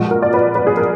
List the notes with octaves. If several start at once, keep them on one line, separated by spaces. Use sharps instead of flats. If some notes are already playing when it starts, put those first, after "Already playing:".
Already playing: A#2 F3 G#3 F#4
A#4
D5
B4
B4
G#4
A#4